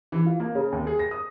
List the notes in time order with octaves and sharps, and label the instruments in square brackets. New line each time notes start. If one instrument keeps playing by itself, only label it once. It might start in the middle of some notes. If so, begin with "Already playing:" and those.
[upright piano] E3
F4
A#3
C#3
D#2
G#4
A#6
D#6